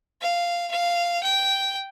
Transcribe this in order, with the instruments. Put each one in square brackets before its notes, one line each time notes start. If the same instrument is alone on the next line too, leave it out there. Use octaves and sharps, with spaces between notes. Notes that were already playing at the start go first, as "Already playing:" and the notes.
[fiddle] F5
F5
G5